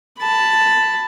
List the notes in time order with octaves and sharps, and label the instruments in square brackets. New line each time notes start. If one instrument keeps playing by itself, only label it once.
[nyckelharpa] A5 B5